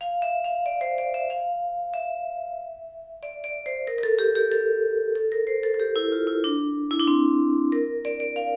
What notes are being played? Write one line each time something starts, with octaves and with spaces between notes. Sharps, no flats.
F5
E5
F5
D5
C5
D5
E5
F5
E5
D5
D5
C5
A#4
A#4
A4
G4
G4
A4
A4
A#4
C5
A4
A4
G4
E4
F4
E4
D4
E4
D4
C4
A#4
D5
D5
F5